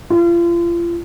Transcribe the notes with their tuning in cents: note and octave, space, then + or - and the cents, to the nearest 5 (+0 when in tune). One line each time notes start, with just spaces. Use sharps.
F4 -35